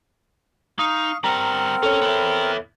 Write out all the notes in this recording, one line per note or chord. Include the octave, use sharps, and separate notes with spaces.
D#4 F5 C#6 D#6
G3 C4 A#4 F#5 A#5
C#4 A4 C#5
B3 E4